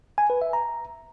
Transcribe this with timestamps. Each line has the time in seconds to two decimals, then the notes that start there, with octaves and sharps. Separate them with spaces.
0.18 G#5
0.30 B4
0.42 E5
0.53 A#5